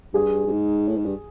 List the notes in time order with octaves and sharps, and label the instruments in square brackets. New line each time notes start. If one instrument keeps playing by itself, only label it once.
[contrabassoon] G2 [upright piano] G#4
[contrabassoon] G2
G#2
A2
G#2
G2